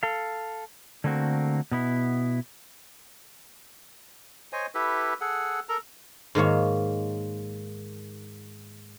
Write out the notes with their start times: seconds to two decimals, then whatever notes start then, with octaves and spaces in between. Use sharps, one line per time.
0.03 A4 F5
1.04 D3 A3 A#3 C4 F#4
1.71 B2 B3 E4
4.53 C5 C#5 D#5 G#5
4.75 E4 G4 A4 B4
5.21 G#4 A4 F#5
5.69 A4 A#4 A#5
6.35 G#2 D#3 A#3 C#5